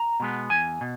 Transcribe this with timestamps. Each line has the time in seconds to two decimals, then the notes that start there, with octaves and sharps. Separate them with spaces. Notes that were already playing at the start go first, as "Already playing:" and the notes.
Already playing: A#5
0.20 B2 G#3 B3
0.50 E2 G#5
0.81 B2